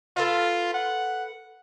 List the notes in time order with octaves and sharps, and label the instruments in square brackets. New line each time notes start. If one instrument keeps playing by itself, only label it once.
[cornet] F4 [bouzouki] A4 B4 F5
[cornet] F#5